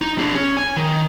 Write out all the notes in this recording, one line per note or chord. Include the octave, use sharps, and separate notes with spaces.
D#4
D4 G#4
C#4
G#5
D#3